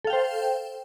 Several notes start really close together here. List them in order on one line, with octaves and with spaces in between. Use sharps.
A4 F5 G5 C5